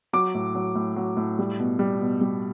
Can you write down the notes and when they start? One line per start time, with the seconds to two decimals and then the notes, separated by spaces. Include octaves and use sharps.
0.13 F#3 D6
0.35 A2
0.55 F#3
0.75 A2
0.96 F#3
1.17 A2
1.39 G3
1.59 B2
1.79 G3
2.00 B2
2.21 G3